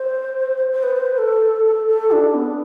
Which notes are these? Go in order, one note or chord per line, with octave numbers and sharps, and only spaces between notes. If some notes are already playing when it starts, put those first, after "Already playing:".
Already playing: C5
C5
B4
C5
B4
A4
A4
A4
D4
B3